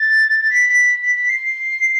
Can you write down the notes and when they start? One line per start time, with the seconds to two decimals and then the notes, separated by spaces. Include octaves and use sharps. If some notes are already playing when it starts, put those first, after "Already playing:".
Already playing: A6
0.40 A6
0.50 B6
0.69 B6
1.03 B6
1.16 B6
1.28 C7